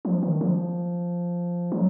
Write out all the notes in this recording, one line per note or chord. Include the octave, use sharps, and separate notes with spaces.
F3
D#3
F3
F#3